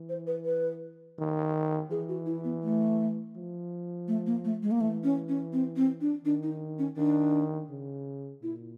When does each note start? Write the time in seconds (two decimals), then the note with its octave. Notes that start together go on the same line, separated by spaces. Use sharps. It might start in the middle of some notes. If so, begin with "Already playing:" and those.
Already playing: E3
0.09 C5
0.27 B4
0.45 B4
1.18 D#3
1.90 E3 G#4
2.09 F#4
2.26 E4
2.44 B3
2.63 A3
3.36 F3
4.08 A3
4.26 A#3
4.45 A3
4.63 G#3
4.71 A#3
4.80 E3 A3
5.04 C#4
5.29 C#4
5.53 C4
5.76 C4
6.01 D4
6.25 D#3 D4
6.43 D#4
6.79 C#4
6.97 D#3 D4
7.70 C#3
8.42 A#2 E4